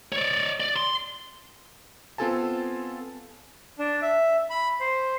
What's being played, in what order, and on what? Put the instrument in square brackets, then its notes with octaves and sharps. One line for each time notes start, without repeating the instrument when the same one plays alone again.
[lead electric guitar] C#5 D5
D5
C6
[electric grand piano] B3 C4 F4 A4 G#5 A5
[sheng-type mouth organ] D4
E5
B5
C5